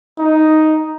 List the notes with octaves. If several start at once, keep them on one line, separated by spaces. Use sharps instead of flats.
D#4